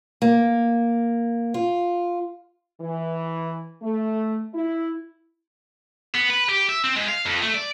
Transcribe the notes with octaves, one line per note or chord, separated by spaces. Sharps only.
A#3
F4
E3
A3
E4
B3
B4
G4
E5
C4
G#2
F5
F2
A3
D5